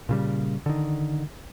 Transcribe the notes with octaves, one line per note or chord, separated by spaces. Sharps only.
A#2 C#3 G3
D3 D#3